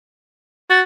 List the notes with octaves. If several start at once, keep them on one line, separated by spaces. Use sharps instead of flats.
F#4 A6